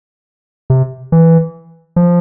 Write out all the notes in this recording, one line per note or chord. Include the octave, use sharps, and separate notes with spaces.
C3
E3
F3